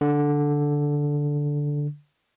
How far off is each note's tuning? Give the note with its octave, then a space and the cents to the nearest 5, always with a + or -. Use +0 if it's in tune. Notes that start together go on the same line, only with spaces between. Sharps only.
D3 -5